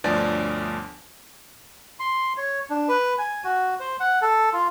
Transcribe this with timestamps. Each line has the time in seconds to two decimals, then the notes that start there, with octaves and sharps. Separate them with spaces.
0.04 G1 D2 F3 D5
2.00 C6
2.37 C#5
2.70 D4
2.88 B4
3.18 G#5
3.44 F#4
3.80 C5
4.00 F#5
4.22 A4
4.53 F4